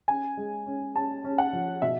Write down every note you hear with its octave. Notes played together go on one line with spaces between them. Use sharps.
C#4 G#5
G#3
C#4
C#4 A5
C#4
F#5
F3
B2 E5